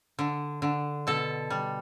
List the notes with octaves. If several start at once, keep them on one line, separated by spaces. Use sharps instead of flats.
D3
D3
B2 A4
G3